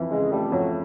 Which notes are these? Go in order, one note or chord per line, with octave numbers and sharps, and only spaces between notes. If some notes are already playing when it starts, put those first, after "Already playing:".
Already playing: F2 E3
C#3 G#3
G3 A3
F2 F#3